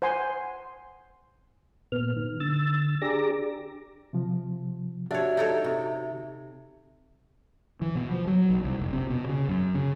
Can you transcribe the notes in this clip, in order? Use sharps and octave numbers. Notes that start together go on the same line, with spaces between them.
C5 F#5 G#5 C6
A#2 B3 F6
D#3
D3 E6 A6
D4 G4 G#4 A#5 D6 A#6
C3 F3
D4 F#4 G4 C#5 E5
D#4 A4 C#5
C3
E3
B2
F3
F#3
B1
C2
F1
C3
B2
C#3
F#2
C#3